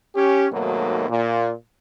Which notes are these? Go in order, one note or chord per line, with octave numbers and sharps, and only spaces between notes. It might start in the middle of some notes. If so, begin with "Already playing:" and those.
C#4 G4
D#2 G#2 B2 F#3 A3 A#3
A#2